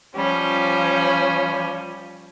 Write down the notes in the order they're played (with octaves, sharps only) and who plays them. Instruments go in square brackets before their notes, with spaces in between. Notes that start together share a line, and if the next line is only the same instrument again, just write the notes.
[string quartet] F3 G3 C#4